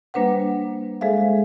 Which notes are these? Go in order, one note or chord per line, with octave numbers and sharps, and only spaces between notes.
G3 A#3 D4 B4 C5 F#5
G#3 G#4 A4 C5 E5 F5